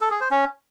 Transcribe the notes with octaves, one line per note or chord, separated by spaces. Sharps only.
A4
G#4
C5
C#4